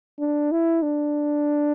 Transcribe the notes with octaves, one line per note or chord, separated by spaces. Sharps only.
D4
E4
D4